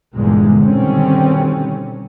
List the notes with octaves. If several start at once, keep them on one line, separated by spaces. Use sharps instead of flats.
G1 E2 A#2 D3 G#3
B2 D3 D#3 G3 C4 C#4